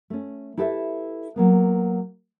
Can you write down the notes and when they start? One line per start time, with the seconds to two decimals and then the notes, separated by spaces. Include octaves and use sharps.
0.10 A3 C#4
0.57 E4 G4 A4 B4 D5 E5
1.36 F#3 A#3 B3